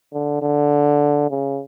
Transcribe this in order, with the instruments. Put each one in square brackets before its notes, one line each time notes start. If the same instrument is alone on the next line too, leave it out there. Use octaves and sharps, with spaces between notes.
[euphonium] D3
D3
C#3